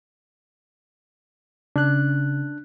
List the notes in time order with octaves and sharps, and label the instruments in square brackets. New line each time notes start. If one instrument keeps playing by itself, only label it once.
[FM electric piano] C#3 [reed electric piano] D4 F#6